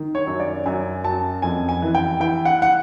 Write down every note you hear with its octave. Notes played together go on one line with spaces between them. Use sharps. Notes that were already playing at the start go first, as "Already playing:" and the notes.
Already playing: D#3
C#5
F#2
D5
F#2 G#5
F#2 A5
F2 G#5
G#5
E3
G5
E3 G5
F#5
F#5